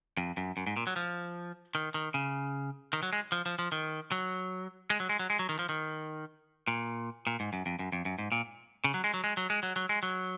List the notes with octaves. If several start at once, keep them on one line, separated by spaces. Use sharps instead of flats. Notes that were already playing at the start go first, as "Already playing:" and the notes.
F2
F#2
F#2
G#2
A#2
F#3
F3
D#3
D#3
C#3
D#3
F#3
G#3
F3
F3
F3
D#3
F#3
G#3
F#3
G#3
F#3
G#3
F#3
D#3
F3
D#3
A#2
A#2
G#2
F#2
F2
F#2
F2
F#2
G#2
A#2
C#3
F#3
G#3
F#3
G#3
F#3
G#3
F#3
F#3
G#3
F#3